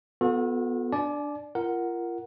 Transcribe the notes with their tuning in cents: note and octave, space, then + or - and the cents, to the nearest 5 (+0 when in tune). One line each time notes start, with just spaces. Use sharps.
B3 +5 F#4 -45 A4 +0
D4 +0 D5 +0 G#5 +45
F4 -30 A#4 +0 F#5 +0